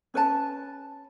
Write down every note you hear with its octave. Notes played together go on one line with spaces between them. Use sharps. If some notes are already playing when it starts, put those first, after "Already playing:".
C#4 B4 C#5 A5